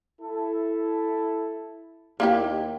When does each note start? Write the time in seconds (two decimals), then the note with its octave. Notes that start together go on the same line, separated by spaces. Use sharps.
0.21 E4 A4
2.20 D#2 A#3 E4 G4